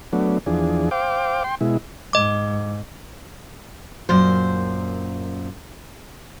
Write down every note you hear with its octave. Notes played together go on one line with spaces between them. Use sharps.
F#3 A3 B3 D4
E2 F3 D4 G#4
C5 F5 G5 D6
G5 C6
B2 G#3 E4
G#2 D#5 D6
F#2 A#2 C5